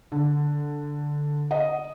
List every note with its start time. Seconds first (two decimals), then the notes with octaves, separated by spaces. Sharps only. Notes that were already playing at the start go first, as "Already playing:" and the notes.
0.12 D3
1.51 D#5